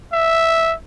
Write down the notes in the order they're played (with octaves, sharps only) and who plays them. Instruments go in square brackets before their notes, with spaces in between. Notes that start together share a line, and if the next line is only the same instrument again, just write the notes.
[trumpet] E5